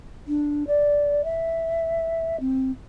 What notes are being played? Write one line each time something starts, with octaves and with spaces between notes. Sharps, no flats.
D4
D5
E5
C4